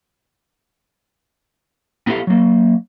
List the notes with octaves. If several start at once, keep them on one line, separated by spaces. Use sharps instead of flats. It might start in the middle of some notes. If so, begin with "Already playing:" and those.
B3 E4 G4 A4 F5
F#3 A#3